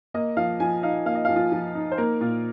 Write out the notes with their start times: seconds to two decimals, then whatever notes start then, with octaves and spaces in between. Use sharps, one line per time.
0.14 A#3 D#5
0.37 F3 F5
0.60 F3 G#5
0.83 D#4 F5
1.05 A#3 F5
1.15 D#5
1.25 F5
1.29 F3
1.36 F4
1.52 F3
1.75 D#4
1.92 C5
1.98 A#3 A#4
2.20 A#2 F4